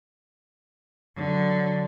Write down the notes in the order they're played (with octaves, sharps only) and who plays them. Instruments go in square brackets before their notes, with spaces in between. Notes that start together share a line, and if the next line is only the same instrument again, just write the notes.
[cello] D3 F#3